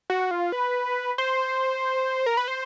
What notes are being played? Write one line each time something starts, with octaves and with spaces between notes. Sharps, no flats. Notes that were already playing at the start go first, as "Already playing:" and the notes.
F#4
F4
B4
C5
A#4
B4
C5